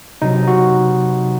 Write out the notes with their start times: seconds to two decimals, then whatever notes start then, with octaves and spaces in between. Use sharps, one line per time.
0.22 C3 F#3 D#4
0.47 F#4